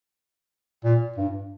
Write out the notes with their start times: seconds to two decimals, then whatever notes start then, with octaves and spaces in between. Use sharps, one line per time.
0.84 A#2
1.17 G2